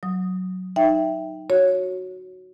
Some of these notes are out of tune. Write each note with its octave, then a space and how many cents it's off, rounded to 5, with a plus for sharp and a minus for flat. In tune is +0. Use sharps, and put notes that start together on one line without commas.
F#3 +0 D#6 +0
D#4 +0 E5 +0 G5 +0
F#4 +0 C#5 +0